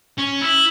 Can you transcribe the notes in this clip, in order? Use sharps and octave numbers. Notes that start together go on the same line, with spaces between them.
C#4
E4